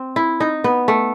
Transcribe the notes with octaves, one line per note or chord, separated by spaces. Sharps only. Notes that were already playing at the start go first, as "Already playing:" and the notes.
Already playing: C4
E4
D#4
B3
A3